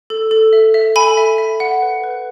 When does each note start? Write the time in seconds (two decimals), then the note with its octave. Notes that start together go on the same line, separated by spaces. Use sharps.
0.10 A4
0.31 A4
0.53 E5
0.74 E5
0.96 A4 G#5 B5
1.17 E5
1.38 E5
1.60 F#5
1.82 B4
2.04 B4